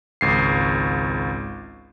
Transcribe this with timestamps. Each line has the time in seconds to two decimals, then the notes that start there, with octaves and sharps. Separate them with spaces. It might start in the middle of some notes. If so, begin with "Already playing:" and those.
0.21 G#1 C#2 C7